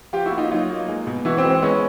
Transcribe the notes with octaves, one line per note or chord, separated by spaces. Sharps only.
F3 F4 G4
E4 F#4
A#3
D#4 F4
F#3 D#4 F4
A#3
G#3
B2
E3 E4 F#4
C4
G#3
C4
G#3 B3 C#4